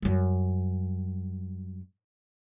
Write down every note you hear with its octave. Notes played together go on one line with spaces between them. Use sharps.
F#2 G3